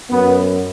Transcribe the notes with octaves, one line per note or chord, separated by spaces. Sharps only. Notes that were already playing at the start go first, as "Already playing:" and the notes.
F#2 B3